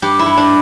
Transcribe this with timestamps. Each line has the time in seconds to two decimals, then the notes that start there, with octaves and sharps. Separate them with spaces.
0.02 G2 G4
0.19 E4
0.26 G2
0.37 D4